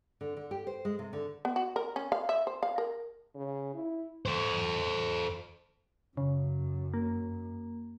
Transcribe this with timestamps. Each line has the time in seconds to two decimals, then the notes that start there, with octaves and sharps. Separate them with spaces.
0.21 D3
0.37 D3
0.51 G4
0.67 C5
0.85 G#3
0.99 C3
1.13 D3
1.45 B3
1.56 F#4
1.76 A#4
1.96 C#4
2.12 F5
2.29 E5
2.47 C5
2.63 F5
2.78 A#4
3.35 C#3
3.74 E4
4.26 A4 C5
6.17 F#2 C#3
6.94 A#3